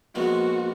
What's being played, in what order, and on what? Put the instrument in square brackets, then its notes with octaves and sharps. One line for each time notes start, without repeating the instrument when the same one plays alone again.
[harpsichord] A#1 A#2 G#3 B3 [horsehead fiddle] F#4